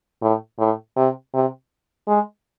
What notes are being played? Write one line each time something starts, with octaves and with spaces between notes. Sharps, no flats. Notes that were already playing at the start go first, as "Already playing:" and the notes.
A2
A2
C3
C3
G#3